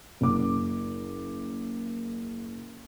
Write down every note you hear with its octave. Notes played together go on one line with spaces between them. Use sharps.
F#1 D6